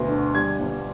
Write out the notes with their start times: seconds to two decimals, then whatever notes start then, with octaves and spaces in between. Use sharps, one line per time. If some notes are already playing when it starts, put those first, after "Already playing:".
Already playing: D2 B2 B3
0.08 D3
0.34 G3 G#6
0.60 G1